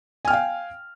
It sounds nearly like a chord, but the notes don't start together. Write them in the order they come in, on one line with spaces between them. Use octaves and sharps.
G#5 F6 G5 F5